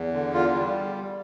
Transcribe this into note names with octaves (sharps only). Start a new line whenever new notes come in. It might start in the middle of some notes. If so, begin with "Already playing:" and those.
Already playing: E2
D3
E2 F4
G3